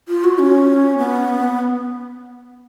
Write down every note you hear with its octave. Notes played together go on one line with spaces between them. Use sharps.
F4
F#4
C#4
B3